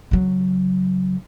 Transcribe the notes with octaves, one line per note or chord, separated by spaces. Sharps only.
C#3 F#3